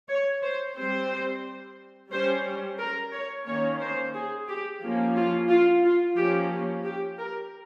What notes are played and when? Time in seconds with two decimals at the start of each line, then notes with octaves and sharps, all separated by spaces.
0.09 C#5
0.43 C5
0.76 G3 C4 C5
2.11 G3 C#4 C5
2.79 A#4
3.13 C#5
3.47 D#3 A#3 C#4 C#5
3.80 C5
4.14 G#4
4.48 G4
4.82 F3 A#3 C#4
5.16 F4
5.49 F4
5.83 F4
6.17 F3 A#3 C#4 G4
6.85 G4
7.19 A#4